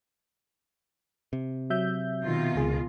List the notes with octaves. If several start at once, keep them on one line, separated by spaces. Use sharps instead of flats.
C3
F#3 E5 G6
B2 D#3 F4
C#2 G#4